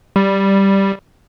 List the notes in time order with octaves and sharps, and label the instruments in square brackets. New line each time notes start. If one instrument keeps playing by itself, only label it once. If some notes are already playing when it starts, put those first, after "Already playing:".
[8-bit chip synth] G3